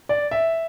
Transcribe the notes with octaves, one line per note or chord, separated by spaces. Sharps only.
D5
E5